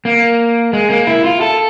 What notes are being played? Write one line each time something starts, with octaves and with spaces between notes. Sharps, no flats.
A#3
G#3
A#3
E4
F4
A4